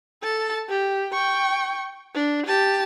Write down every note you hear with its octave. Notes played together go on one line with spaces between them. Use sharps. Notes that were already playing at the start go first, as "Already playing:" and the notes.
A4 A5
G4
G5 C#6
D4
G4 A5